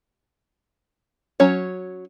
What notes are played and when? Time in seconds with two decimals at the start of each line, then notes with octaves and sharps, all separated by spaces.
1.40 F#3 C#4 C#5